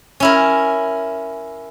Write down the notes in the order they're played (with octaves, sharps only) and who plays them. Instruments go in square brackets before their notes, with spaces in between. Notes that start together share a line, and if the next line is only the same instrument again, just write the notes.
[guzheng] C#4 E4 A#4